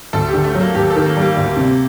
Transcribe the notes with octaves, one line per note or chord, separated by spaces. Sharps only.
D2 A4
G4
D3
A3
F#3
A#3
D#2 G4
A4
D#3
A#3
G3 A#3
D2
C3